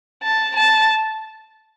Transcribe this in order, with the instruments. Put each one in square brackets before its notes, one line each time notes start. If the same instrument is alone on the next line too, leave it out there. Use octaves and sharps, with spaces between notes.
[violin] A5
A5